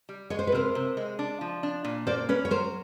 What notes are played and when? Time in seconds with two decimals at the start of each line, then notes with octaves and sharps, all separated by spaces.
0.09 G3
0.30 G#3 C#5
0.39 C5
0.47 B4
0.52 C3 A#4 C5
0.75 C3
0.97 G#3
1.19 D4
1.41 F3
1.63 D4
1.85 A#2
2.07 A#3 C5 D5
2.29 C#4 B4 C#5
2.45 C#5
2.51 F#3 A#4 C5